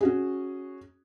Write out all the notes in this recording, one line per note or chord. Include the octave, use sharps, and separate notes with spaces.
C#4 F#4 G#4